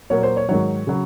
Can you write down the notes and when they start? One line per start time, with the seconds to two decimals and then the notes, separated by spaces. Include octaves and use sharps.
0.10 A#2 F#3 A#3 C#5
0.23 C5
0.37 C#5
0.49 G#2 D#3 F#3 C#5
0.87 C#3 F#3